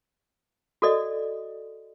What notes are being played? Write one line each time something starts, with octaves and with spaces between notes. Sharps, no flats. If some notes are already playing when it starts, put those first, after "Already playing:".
F#4 A4 D5 D#5